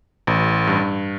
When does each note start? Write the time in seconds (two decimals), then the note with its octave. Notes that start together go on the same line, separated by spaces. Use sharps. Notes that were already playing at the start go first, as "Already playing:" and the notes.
0.27 A1
0.67 G2